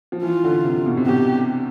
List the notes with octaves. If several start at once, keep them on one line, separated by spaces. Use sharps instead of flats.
F3
E3 F4
D3
C3
B2
C3
B2 G4